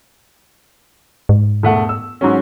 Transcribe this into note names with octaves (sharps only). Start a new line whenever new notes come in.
G#2
E1 A3 F#5
E6
G#2 F#3 C#4